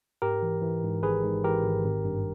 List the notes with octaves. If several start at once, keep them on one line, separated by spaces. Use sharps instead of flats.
G#2 G4 A#4
E3
E3
G#2
G#1 G#4 B4
G#2
E3 G4 A#4
G#1
G#1
G2